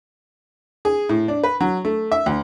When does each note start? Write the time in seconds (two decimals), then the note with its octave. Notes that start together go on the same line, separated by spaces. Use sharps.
0.85 G#4
1.09 A2
1.28 D4
1.44 B4
1.61 F#3
1.85 A3
2.11 E5
2.26 D2